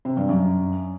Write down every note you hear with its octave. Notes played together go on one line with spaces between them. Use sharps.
C3
G2
F#2